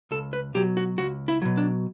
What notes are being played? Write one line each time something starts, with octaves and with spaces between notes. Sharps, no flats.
C#2 A4
B4
B2 F#3 G4
F#4
C#2 F#4
E4
B2 F#3
D4